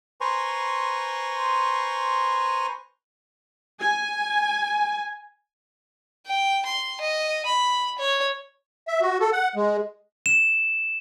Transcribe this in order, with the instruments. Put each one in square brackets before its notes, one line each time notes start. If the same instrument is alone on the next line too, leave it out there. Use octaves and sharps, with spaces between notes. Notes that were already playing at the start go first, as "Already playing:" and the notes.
[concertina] B4 C5 G#5 A#5 C6 C#6
[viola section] G#5
[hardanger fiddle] G5
C6
D#5
B5
C#5
[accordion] E5
F#4
A4
F#5
G#3
[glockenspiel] E7